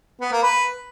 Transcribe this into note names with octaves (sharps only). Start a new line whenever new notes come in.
B3
A#3
B4